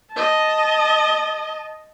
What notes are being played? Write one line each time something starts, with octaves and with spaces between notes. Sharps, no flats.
D#5 A5